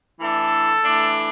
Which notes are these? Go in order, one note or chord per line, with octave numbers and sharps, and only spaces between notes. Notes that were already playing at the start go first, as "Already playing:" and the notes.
E3 A3 D4 A4
E3 A3 D4